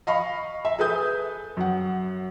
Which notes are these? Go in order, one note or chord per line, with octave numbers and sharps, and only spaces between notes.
D#5 F5 B5 C#6
E5
G#4 A4 B4 G#5 D#6 G6
F#2 F#5